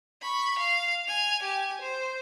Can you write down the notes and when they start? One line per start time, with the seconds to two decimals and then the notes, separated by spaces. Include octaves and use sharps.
0.22 B5 C#6
0.59 F5
1.07 G#5 F7
1.43 G4 G#5
1.81 C5